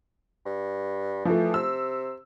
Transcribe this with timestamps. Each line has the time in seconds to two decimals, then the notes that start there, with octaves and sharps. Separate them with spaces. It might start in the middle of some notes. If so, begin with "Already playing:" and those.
0.46 G2
1.25 E3 F3 A3
1.54 C3 E6